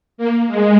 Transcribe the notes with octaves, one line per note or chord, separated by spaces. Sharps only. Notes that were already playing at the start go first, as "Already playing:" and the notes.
A#3
G#3